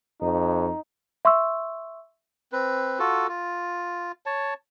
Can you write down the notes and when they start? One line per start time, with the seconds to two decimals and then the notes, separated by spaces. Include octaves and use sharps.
0.22 F2 D#4
1.25 E5 C6 C#6 E6
2.52 C4 B4
2.99 F4 F#4 A4
3.28 F4
4.26 C#5 A5